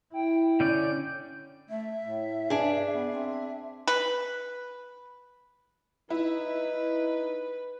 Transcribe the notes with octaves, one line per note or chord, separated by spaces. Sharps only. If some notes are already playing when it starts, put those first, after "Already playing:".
E4 G5
D3 C#4 D5 G6
A3 E5
A2
G2 D4 G#4
B3
C4 E5
B4
D#4 E4 B4